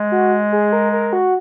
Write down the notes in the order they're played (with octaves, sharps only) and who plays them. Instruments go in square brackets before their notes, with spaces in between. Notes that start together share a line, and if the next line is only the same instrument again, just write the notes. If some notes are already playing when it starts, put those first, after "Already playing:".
Already playing: [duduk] G#3
[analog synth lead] F#4
G#4
A#4
A#4
F#4